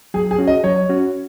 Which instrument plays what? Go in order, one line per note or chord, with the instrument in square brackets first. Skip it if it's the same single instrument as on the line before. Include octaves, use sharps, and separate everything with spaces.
[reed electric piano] F#3 [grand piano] G#4
[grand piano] G#4
[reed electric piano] C#4 F#4
[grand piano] D#5
[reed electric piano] F#3 [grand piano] C#5
[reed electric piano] C#4 F#4